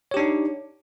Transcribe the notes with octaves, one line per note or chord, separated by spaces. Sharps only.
D4 D#4 G4 C#5